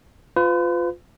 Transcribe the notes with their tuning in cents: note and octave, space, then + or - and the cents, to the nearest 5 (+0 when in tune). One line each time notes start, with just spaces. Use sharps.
F4 +5 B4 +40